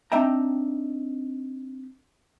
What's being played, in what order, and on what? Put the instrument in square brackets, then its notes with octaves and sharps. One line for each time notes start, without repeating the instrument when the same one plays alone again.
[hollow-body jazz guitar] C4 D4 D#4 E5 G5 A#5